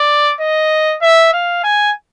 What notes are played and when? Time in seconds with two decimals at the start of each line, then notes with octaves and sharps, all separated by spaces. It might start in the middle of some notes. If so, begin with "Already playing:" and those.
Already playing: D5
0.41 D#5
1.02 E5
1.33 F5
1.64 G#5